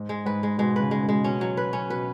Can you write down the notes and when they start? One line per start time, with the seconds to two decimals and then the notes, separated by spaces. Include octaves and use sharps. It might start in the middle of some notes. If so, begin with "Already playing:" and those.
Already playing: G#2
0.09 G#3
0.26 G#2 B4
0.43 G#3
0.58 B2 G#3
0.76 C#3 B4
0.91 G#3
1.03 B2
1.09 G#3
1.24 B2 C#4
1.41 F#3
1.57 B4
1.73 C#4
1.90 B2 B4